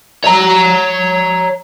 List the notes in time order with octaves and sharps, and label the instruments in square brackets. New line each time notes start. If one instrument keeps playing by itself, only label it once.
[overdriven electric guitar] C#5 A#5